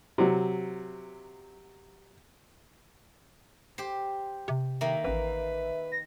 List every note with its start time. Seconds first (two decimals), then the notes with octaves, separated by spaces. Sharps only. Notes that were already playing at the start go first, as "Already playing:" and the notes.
0.18 C3 F#3
3.78 G4 C5
4.48 C3
4.81 D#3 A#3 E5
5.04 A1 B4
5.92 A#6